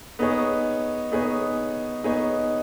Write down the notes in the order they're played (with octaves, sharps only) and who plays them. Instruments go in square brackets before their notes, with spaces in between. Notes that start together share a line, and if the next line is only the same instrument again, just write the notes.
[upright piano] B3 D#4 G#4 C#5
B3 D#4 G#4 C#5
B3 D#4 G#4 C#5